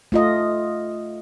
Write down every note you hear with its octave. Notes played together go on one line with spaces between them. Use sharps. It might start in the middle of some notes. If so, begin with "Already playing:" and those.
A3 F4 D#5